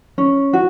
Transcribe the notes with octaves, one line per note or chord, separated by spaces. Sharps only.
C#4
F#4